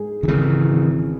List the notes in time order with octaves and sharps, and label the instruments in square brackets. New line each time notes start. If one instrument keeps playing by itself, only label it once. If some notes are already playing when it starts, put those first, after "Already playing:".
Already playing: [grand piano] G#2 G#4
[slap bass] D#3
[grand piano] G#1 [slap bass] C#3 E3
[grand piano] G#1